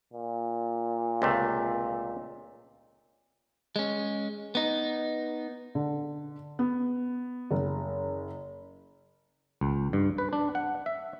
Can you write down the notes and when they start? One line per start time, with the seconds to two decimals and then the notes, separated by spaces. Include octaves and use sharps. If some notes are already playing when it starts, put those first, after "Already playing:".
0.13 A#2
1.22 C#2 C3 A3
3.76 G#3 C#4
4.55 B3 D#4
5.75 D3
6.59 B3
7.51 F#1
9.61 C#2
9.93 G2
10.18 B4
10.33 D4
10.55 F#5
10.86 E5